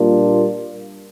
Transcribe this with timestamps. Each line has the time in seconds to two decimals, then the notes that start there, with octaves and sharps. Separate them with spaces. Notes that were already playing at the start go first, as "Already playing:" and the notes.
Already playing: A#2 G3 A#3 D4 F4